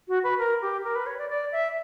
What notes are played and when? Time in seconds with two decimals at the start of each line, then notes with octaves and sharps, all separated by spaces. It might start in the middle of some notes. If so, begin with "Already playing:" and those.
0.08 F#4
0.23 B4
0.38 A#4
0.61 G4
0.84 A#4
0.95 B4
1.06 C#5
1.18 D5
1.29 D5
1.52 E5